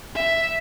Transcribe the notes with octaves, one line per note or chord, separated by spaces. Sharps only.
E5